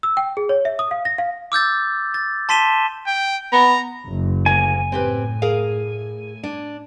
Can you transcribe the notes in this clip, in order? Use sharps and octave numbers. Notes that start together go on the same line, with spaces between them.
E6
G5
G#4
C#5
E5
D#6
F5
A#6
F5
D6 E6 G6 A6
A6
A5 C6 B6 D#7 E7 G7
G5
B3 A#5
F#1
D2 A#3 G#5
A2 C4 G4 B4
G#4 A#4 F5
D4